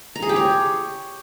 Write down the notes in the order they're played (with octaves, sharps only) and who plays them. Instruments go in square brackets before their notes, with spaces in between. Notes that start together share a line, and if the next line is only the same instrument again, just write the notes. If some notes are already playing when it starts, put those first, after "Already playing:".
[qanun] A#5
G#4
G4
C#5